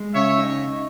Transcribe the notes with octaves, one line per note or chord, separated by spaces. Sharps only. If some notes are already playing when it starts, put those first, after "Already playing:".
Already playing: G#3
C#3 C#5 E5
D#4